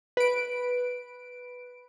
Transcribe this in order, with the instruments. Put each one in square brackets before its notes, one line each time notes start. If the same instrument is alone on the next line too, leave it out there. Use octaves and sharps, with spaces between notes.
[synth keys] B4 D7